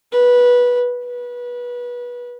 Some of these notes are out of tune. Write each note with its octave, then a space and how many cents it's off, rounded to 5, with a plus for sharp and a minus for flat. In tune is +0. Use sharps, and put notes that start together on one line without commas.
B4 -15
B4 -25